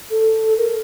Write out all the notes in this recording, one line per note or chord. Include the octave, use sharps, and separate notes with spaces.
A4
A#4